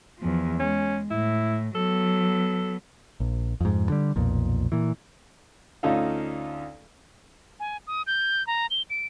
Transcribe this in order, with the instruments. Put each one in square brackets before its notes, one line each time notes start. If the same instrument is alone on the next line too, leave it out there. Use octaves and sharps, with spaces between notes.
[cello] E2 F3
[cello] G#3 [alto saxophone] C#4
[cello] A2 [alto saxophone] E4
[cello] F#3 B3 [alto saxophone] A4
[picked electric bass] A#1
F2 G#2
D3 G3
B1 F2 A#2
A#2 E3
[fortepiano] D2 C#4 D#4 F4 A4 F5
[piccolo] G#5
D#6
G6
A#5
G7
D7